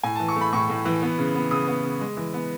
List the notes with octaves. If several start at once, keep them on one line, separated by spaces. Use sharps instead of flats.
A2 G#5
A5
E3
C#6
A3 B5
A2 C#6
A2
E3
B3
C#3
B3
C#3 D#6
B3
C#3
G#3
E3
B3